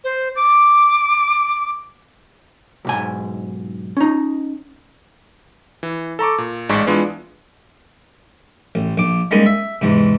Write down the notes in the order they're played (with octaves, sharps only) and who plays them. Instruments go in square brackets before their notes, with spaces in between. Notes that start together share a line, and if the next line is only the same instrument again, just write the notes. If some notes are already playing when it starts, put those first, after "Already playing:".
[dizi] C5
D6
[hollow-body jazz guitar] B1 G#2 G#5
C#4 D#4
[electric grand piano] E3
A4 A#5 C#6 D6
A#2
A1 G#2 G#3 D5 G#5 C#6
E3 G#3 B3 D4 F4
[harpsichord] A1
A#1 D6
G3 G#3 A#3 C#4 D#4
E5
E2 G#2 C3